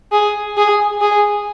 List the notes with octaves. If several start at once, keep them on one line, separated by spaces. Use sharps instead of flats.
G#4
G#4
G#4